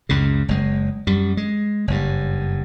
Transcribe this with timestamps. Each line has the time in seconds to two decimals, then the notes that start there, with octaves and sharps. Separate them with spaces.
0.09 C#2 F#2 C#3
0.48 F#1 G#3
1.07 F#2 G3
1.37 G#3
1.88 F#1 G2